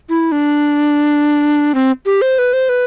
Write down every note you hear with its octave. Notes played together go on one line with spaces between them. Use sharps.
E4
D4
C4
G4
C5
B4
C5
B4